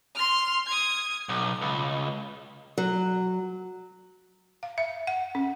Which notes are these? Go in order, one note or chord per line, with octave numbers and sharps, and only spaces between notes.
C6 F6
D#6 G#6
B1
C#2
F#3
F5
E5
F#5
C#4